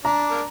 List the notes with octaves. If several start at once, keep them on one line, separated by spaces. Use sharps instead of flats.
D4 A#5
A#4